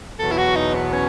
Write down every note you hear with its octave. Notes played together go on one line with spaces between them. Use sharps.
E2 B2 F#3 A4
E4
F#4
D#4
B3
C#4